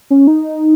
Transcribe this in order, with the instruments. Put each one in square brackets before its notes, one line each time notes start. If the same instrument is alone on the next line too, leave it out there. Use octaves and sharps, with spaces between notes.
[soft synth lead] C#4
D#4